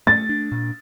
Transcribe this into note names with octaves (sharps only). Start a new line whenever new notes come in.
A3 A6
D4
A#2